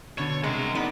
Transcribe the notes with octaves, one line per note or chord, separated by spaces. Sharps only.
B2 D3 C#5
C3 G#3 A#4 F#5
B3 D#4 D5